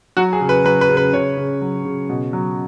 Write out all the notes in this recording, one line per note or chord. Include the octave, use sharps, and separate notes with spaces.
F#3 F#4
G#4
C#3
B4
F#3 B4
B4
C#3
B4
C#3 C#5
C#3
F#3
C#3
B2
F#3